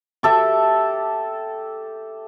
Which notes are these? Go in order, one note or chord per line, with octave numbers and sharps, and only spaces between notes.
G4 A4 E5